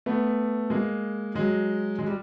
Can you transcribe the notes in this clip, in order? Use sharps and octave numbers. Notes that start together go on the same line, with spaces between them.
A3 B3
G#3 A#3
F#3 G#3
G#3
G3